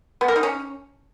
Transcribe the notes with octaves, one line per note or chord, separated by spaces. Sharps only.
B3
A#4
D#4
C#4